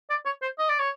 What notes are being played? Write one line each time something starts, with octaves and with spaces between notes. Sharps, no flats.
D5
C#5
C5
D#5
D5
C#5